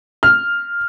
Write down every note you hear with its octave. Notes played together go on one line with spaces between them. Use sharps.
F6